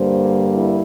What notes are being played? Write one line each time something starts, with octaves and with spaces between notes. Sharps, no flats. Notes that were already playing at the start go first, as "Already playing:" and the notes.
Already playing: G2 D3 G3 A#3 C5
E4